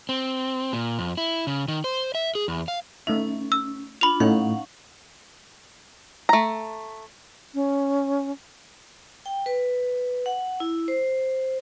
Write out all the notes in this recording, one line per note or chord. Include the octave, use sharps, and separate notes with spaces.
C4
A#2
F2
E4
C#3
D#3
C5
E5
G#4
E2
F5
A3 C#4 D#4 E5
E6
D4 F4 B5 F7
A2 C#4 D#4 F5 F#5 C#6
A3 A#5
C#4
G5
B4
F#5
E4
C5